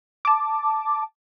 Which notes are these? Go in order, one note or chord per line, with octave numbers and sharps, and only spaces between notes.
A5 D6